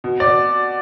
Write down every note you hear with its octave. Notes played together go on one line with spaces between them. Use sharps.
B2
D5
B2